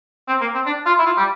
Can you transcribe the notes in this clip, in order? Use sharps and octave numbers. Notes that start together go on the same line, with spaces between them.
C4
A#3
C4
D4
F4
E4
F4
G3